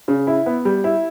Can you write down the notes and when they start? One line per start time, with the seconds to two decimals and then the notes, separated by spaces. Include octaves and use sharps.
0.08 C#3
0.27 E4
0.46 B3
0.65 G3
0.84 E4